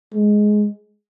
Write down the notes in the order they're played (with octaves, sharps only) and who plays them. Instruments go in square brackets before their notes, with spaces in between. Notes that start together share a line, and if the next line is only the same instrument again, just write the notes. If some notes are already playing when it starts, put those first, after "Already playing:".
[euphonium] G#3